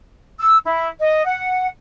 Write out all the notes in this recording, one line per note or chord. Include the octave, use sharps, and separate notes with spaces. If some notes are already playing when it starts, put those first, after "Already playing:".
E6
E4
D#5
F#5